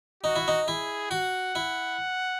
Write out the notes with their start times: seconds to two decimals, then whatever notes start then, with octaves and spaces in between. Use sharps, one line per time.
0.23 D#4 F#4
0.36 E4
0.48 D#4
0.68 E4 G#4
1.11 F#4 F#5
1.55 E4